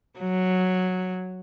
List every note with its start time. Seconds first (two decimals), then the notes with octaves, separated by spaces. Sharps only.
0.20 F#3